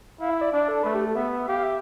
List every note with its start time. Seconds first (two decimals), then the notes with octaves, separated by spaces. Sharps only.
0.20 E4 F5
0.30 E5
0.41 D5
0.53 D4 D5
0.68 A4
0.83 A3 B4
0.94 G4
1.05 A4
1.15 B3 E5
1.32 E5
1.42 E5
1.48 G4 F5
1.63 E5